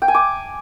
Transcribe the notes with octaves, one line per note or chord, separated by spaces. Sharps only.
G5
G#5
D6